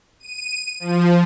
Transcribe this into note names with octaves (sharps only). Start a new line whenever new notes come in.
D#7
F3